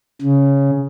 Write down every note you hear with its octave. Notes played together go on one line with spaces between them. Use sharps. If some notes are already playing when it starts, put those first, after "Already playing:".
C#3